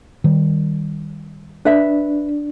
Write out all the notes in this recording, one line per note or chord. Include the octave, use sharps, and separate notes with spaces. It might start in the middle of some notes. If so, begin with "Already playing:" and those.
D#3 G3
D4 B4 E5